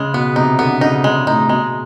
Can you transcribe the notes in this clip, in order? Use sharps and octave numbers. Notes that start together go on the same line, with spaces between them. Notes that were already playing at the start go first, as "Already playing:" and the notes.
Already playing: C#3 G#3
B2 B3
C3 D#4
D3 B3
C#3 D#4
C#3 G#3
A2 D#4
B2 G#3